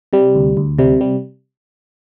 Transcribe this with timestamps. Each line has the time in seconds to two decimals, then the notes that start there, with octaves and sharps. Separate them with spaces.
0.13 C3 G3
0.35 D2
0.57 D2
0.79 C3 G3
1.01 G3